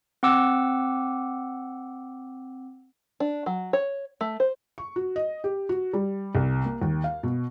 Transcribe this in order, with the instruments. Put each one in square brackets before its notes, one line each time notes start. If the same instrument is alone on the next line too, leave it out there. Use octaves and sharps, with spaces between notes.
[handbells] C4 F#5 D6 E6
[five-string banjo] D4
F#3
C#5
A3
C5
[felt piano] C#6
F#4
D#5
G4
F#4
G3
C2
A#3
D#2
F5
B2